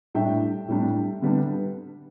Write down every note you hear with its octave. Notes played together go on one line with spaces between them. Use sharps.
A2 G3 D4 E5 G5
A2 G3 D4
D3 G3 B3 D4